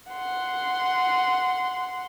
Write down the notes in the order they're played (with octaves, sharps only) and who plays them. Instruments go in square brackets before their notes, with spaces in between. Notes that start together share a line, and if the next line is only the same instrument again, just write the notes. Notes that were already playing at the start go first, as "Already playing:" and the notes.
[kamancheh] F#5 C6